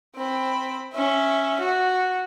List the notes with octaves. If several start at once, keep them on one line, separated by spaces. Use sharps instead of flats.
C4 B5
C#4 E5
F#4